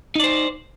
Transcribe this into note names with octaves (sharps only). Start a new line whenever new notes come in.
D#4 C5 D5